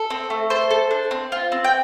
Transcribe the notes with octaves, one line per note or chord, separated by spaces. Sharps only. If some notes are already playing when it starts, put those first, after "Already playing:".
Already playing: A4
C4
A3
A4 C5
A4
D4
C4
F4
C4
G5